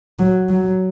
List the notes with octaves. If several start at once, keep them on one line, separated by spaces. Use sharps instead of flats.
F#3
F#3